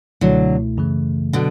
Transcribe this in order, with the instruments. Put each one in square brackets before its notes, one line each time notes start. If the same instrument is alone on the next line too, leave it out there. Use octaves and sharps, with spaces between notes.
[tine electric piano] C#2 B2 A3 E4 [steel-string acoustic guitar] D3 F#3
[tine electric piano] F#2 C#3 E3 A3
[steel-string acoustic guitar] B2 D3 [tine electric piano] F#3